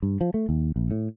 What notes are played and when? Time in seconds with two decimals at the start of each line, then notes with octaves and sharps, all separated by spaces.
0.03 G2
0.21 F3
0.34 A3
0.49 D#2
0.76 A#1
0.91 A2